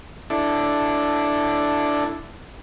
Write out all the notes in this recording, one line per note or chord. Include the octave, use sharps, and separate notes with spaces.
D4 E4 A4